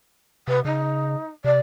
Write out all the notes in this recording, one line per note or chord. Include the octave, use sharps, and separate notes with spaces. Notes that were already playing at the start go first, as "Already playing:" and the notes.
C3 B4
C#3 D#4
C3 D5